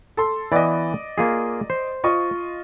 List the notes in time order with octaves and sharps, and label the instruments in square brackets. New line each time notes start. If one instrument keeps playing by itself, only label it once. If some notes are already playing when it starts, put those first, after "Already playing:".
[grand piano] A4 C6
[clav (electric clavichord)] E3 B3 [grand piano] D5 D#5
[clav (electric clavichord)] A#3 F4 G#4
C5
[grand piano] F4 D#5 C#6